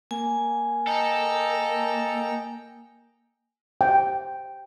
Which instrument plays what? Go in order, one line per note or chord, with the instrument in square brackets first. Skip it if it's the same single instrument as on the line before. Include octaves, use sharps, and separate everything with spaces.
[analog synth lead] A#3 [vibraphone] G#5
[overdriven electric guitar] A4 [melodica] D#5 G5 A#5
[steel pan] G5